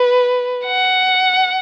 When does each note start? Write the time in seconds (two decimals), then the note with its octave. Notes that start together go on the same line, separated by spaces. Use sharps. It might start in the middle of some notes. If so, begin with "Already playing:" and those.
Already playing: B4
0.65 F#5